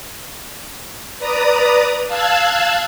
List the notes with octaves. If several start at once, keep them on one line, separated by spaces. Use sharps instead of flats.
B4 D5 A#5 D#6
F5 A5 E6 F#6 G#6